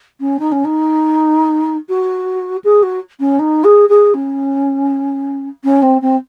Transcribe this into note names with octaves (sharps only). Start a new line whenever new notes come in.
C#4
D#4
C#4
D#4
F#4
G#4
F#4
C#4
D#4
G#4
G#4
C#4
C#4
C4
C4